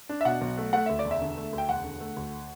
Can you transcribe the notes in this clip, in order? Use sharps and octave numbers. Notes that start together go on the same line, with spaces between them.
D4
E5
B2 F#5
B1
A3
A3 F#5
D2 E5
D5
E1
E5
D3
A3
D2
G5
E1 F#5
D3
A3
D2